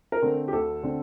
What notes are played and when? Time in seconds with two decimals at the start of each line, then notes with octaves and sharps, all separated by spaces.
0.12 A#4
0.22 D3 A3 C4
0.48 G4
0.53 D2 A4
0.83 D3 A3 C4